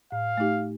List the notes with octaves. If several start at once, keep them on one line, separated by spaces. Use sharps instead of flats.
A2 F5
A3 D#4 G4